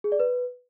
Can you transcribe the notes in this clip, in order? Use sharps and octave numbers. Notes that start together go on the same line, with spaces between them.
G#4
D5
B4